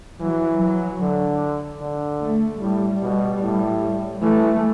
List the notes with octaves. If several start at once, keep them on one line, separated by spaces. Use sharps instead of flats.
E3 F#3
F#3
D3
D3
A3
A2 G3
B2
A2
E3 A3